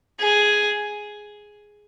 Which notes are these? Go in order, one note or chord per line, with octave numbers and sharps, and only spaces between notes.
G#4